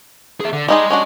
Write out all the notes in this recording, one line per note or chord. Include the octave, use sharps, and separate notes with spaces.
G#4 E5
D3
G3 D#4 G#4 D#5 C6
C#4 D4 F#4